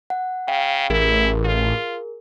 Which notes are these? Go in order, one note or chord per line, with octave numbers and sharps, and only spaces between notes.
F#5
C#3 F5 G5
A1 E4 G#4 A#4
F4